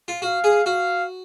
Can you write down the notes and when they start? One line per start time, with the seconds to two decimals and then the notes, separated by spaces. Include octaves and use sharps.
0.08 F4
0.22 F#4 F5
0.44 G#4
0.66 F#4 F5